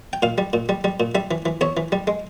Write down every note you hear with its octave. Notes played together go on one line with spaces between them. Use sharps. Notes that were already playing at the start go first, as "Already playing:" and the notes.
G5
A#2 F5
G3
A#2
G3
G3
A#2
G3 E5
E3
E3
E2 C#5
E3
G3
G#3